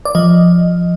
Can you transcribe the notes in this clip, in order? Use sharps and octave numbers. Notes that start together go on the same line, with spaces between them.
D5
F3 D#5